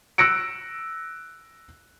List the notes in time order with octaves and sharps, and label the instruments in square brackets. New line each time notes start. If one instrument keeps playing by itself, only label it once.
[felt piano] E6 F#6 A#6 C#7 D7